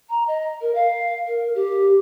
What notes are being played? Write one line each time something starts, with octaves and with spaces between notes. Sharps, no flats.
A#5
D#5
A#4
F5
A#4
G4